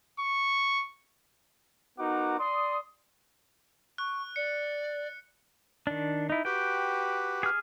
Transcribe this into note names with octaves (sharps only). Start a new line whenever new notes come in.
C#6
B3 D#4 F#4 A#4 F#5 D6
D5 C6 D#6
C#6 F#6
D5 C#7
D#3 D4
D#4 E4
F#4 G4 B4 G5
G#4 F6